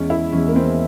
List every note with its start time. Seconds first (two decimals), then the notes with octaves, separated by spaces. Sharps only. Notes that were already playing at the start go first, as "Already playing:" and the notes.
Already playing: E2 E3 G#3 C#4
0.10 E4
0.32 E2 E3 G#3 C#4
0.48 A#3
0.56 C4